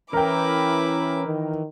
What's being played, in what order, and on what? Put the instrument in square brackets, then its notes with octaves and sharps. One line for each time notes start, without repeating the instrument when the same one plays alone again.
[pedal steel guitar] E3 [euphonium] C#4 [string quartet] E4 B4 D6 [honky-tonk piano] A#4 G5
[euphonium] D#3